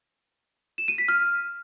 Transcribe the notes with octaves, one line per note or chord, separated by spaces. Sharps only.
E7
D#7
B6
F6